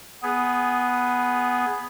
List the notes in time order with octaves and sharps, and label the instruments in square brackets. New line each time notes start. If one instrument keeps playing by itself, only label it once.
[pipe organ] B3 G#4